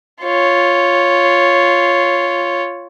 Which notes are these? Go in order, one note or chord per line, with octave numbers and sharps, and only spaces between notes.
F4 C#5